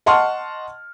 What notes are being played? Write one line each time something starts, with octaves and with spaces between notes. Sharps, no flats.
D#5 F#5 A5 C6 C#6 F6